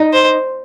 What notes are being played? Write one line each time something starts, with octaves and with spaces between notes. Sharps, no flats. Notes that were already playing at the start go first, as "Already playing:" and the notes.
Already playing: D#4
C5